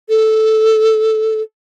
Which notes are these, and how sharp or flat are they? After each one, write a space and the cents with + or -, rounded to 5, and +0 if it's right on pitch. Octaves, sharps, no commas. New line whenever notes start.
A4 -5